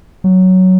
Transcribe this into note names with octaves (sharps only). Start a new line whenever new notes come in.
F#3